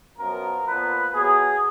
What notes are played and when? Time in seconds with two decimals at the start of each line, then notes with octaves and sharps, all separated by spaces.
0.18 F#2 F3 B3 A#4
0.67 A#2 F3 B3 B4
1.14 B2 F#3 B3 G#4